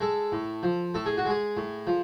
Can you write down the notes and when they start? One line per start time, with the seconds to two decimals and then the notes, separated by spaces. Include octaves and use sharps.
0.01 G#3 A4
0.32 A2
0.63 F3
0.94 A2 A4
1.06 G#4
1.18 F#4
1.25 G#3 G#4
1.57 A2
1.87 F3